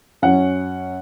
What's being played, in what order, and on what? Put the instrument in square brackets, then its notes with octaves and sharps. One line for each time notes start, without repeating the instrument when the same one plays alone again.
[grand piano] F#2 F#3 C#4 F#5